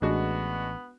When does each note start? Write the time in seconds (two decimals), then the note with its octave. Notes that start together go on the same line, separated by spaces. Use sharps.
0.02 A1 G#3 B3 D4 F#4